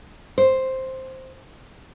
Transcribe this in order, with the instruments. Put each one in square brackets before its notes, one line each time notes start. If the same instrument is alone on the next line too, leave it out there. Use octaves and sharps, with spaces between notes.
[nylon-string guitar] C5